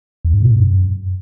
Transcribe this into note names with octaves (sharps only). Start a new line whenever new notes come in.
E2
G#2
B2
G#2
F#2